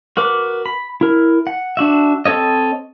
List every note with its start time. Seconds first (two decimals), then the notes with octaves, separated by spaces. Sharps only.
0.17 F#4 A#4 B4 D6
0.66 B5
1.01 E4 A#4
1.47 F#5
1.77 D4 F#4 E5
2.26 C4 A4 C#5 D#5